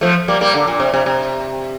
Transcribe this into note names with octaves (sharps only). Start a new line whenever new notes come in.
F3 A3
G3 A#3
G3 A#3
D3
A#2
C3
C3
C3